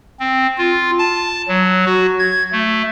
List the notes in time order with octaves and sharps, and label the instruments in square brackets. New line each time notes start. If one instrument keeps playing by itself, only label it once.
[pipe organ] C4
F4
A5
F#3
F#4
G#6
A3